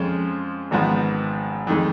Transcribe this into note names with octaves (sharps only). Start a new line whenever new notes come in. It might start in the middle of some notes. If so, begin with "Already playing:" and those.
Already playing: F2 F3 G#3 C#4
G#1 G#2 F3 B3
F2 D#3 G#3